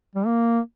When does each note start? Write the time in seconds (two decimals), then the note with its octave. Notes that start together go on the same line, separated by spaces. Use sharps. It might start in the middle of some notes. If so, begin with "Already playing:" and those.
0.16 G3
0.26 A#3